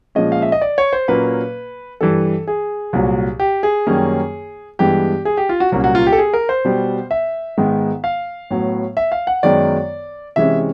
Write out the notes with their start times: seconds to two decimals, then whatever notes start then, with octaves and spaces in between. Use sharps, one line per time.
0.15 A#2 F3 G#3 C#4 D#5
0.32 F5
0.42 E5
0.52 D#5
0.61 D5
0.78 C#5
0.93 C5
1.08 A#2 F#3 A#3 C#4 B4
2.01 G2 E3 G3 A4
2.47 G#4
2.93 C2 A#2 F#3
3.40 G4
3.63 G#4
3.87 F#2 D#3 G3 A#3 C#4
4.79 G2 E3 G#3 B3 G4
5.25 G#4
5.37 G4
5.49 F4
5.60 F#4
5.72 C2 A#2 F#3 A#3 C#4 F#4
5.84 F#4
5.95 F4
6.07 G4
6.12 A4
6.18 G#4
6.33 A#4
6.49 C5
6.65 B2 G3 B3
7.11 E5
7.58 G#2 D#3 G#3 B3
8.04 F5
8.51 A2 F#3 B3
8.97 E5
9.12 F5
9.27 F#5
9.43 F#2 D#3 G#3 B3 D5
10.36 C3 E3 G#3 C#4 E5